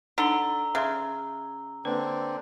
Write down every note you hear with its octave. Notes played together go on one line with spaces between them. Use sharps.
D3 D#4 A#5 E6 G7
C#3 E5 C6
D3 A#3 C4 D4 B4